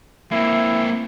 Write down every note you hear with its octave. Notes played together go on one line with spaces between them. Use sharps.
A#3 C4 E4